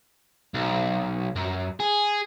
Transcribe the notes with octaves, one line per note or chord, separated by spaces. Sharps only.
B1
F#2
G#4